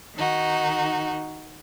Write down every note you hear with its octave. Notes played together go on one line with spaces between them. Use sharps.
D#3 D#4 F#4